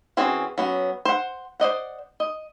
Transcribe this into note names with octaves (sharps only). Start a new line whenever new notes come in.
E3 C4 C#4 F#4 G#4
F#3 B3 C#4
C5 F#5
C5 D5 D#5 F#5
D#5